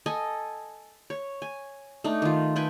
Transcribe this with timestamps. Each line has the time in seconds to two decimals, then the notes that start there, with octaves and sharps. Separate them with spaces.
0.06 A4 D#5 G#5
1.10 C#5
1.42 G#5
2.04 A3 D4 D#4
2.22 D#3 F4
2.56 A4 B4 G5 G#5